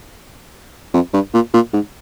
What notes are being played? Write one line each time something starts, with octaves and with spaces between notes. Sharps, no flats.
F2
G2
A#2
A#2
G#2